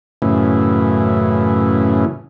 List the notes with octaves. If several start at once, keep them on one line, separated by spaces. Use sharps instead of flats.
F#2 A2 C#3 E3